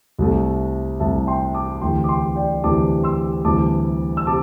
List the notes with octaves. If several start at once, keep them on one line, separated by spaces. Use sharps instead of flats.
C2 C3 A3
C2 C3 A3 E5 A5
G5 C6
A5 D6
D2 C3 E3 G5 C6
D6
G5 C6
D5 G5
D2 C3 E3 A5 D6
C6 E6
D2 C3 E3 G3 A5 D6
E6
C3 A5 D6